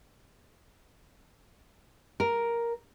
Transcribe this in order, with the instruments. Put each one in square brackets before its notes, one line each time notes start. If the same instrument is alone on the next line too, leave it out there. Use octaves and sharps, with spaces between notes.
[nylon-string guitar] A#4